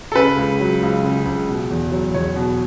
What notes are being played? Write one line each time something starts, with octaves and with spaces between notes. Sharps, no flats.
A4
C#3 B4
C#2
F#3
C#2
C#3
C#2
B2
E2
F#3
E2 C#5
B2